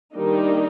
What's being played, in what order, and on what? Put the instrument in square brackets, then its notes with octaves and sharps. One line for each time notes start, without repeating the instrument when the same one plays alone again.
[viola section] D#3 G3 A#3 D4 D#4